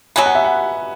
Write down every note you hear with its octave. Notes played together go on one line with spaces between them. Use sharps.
B2 F#3 B3 G#5
F#5
E5
F#5